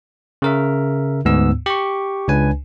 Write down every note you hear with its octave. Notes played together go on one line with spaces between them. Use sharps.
C#3 A#4 E5
D2 G#2 B3 E6
G4 C#6
C#2 D4 B4 G#5